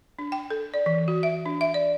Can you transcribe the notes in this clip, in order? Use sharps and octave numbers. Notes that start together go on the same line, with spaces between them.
D4
G5
A4
D5
E3
F#4
E5
D4
E5
D5